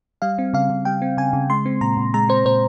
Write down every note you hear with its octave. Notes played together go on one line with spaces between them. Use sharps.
G3 F5
C4
C#3 F5
C#3
G3 G5
C4
C#3 G#5
C#3
G#3 C6
C4
A#2 A#5
A#2
G#3 A#5
C4 C5
A#2 C5